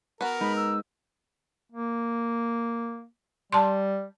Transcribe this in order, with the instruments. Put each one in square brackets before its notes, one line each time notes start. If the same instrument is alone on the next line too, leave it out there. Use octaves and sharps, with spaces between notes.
[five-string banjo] B3 F#4 [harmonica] A#4
[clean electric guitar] G#3 D#4 [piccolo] B5
[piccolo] E6
[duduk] A#3
[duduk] G3 [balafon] A5 C6